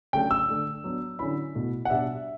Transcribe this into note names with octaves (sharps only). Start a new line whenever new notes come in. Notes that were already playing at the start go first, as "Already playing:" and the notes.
C#3 F#3 A3 D4 G5
E6
D3 A3 D4
F#3 B3 D4
D3 F#3 C#4 E4 B5
B2 A3 E4
F#5
B2 G3 D4 E5